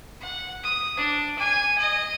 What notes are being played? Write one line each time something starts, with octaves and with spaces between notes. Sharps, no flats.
F#5
D#6
D4
G#5
D#5